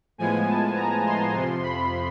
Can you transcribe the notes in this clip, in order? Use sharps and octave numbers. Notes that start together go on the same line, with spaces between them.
A2 F3 G#3 B3 G#5
A5
A#5
C6
F2 C3 F3
B5